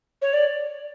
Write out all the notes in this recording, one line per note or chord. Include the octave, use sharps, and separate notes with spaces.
C#5
D5